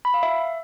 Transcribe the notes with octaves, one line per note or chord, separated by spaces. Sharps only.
B5
F5
E5